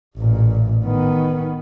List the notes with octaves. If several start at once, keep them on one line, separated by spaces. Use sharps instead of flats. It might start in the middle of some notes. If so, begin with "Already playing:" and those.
A1 A#2
D#3 B3